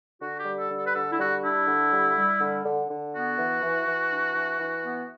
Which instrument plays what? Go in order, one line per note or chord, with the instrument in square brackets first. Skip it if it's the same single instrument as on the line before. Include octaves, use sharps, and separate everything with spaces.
[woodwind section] D3 F#4
G4
G3
A4
D3
A4
B4
D3 A4
E4
G3 F#4
D4 E4
D3
G3
G3
D3
D3
D3
B3 F#4
E3
E3
E3
D4
E3
E3
B3